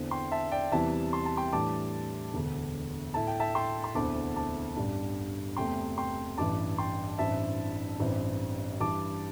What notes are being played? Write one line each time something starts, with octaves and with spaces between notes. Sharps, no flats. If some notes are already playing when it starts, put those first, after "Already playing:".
Already playing: E2 D3 C4 E4
G5 C6
E5 A5
D5 G5
E2 C3 E3 G3 E4 E5 A5
C6
A5
G5 C6
A2 E3 G3 D4 A5 D6
E1 D2 D3
A2 A3 E4 A5
G5
E5 A5
G5 C6
C6
E1 D2 D3 C4 E4 A5 D6
A5 D6
A1 G2 G3 D4
E2 C3 A3 G5 C6
G5 C6
A1 G2 E3 A5 D6
G5 C6
A1 G2 E3 C4 E4 E5 A5
A1 G2 E3 C4
G2 E3 G3 E4 A5 D6